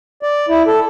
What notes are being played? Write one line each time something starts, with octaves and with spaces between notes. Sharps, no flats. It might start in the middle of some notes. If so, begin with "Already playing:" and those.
D5
E4
A4